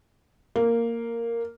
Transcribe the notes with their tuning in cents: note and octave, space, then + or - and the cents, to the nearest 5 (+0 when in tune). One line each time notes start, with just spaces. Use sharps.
A#3 -5